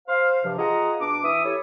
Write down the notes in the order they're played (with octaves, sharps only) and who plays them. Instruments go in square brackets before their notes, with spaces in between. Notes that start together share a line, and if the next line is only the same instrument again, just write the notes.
[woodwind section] C5 F5
G2 C3 F3
F4 G#4 D#5 F#5 A#5
B2 D4 D6
E3 E5 D#6
E4 G4 A4 C#5